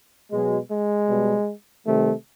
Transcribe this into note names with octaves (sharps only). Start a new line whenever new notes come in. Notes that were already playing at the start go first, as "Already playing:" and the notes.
B2 F#3 G#3
G#3
B2 G3
C3 D#3 G3 A3